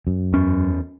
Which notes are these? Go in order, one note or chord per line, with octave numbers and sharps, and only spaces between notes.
F#2
E2 C#4